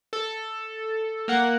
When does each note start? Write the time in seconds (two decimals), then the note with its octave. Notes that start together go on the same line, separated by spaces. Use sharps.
0.13 A4
1.28 A#3 F#5